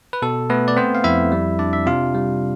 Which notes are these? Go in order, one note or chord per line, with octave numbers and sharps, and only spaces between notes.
B4
B2 A4
A3 B3 B4
D5
B3 C4 C5
F5
F2 E4 E5
G3
D4 D5
E5
C3 F4 F5
G3